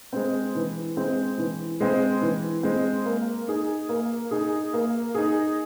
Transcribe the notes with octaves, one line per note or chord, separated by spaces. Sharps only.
G#3 C4
E3
G#3 C4
E3
G#3 C4
E3
G#3 C4
A#3
D#4 G#4
A#3
D#4 G#4
A#3
D#4 G#4